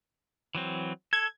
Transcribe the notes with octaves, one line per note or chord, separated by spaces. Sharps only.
E3 F#3 C4
A4 G#6